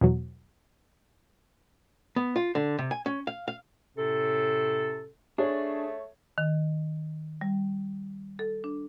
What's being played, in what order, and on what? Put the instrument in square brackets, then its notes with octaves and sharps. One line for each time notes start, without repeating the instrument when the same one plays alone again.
[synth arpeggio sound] E2 B2 F#3
[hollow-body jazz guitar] B3
F4
D3
C3
G#5
C#4
F5
F5
[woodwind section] A2 C3 C#4 A4
[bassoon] A3 [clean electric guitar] D4 [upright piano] G#4 [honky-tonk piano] C#5
[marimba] D#3
G3
A4
D4